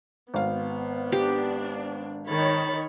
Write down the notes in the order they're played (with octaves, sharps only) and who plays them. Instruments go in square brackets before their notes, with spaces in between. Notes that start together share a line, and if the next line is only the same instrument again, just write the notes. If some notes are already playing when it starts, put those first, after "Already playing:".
[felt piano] G#1 F5 [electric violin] B3
[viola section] D4 [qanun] G4
[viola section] D#3 C#5 [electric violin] B5 A6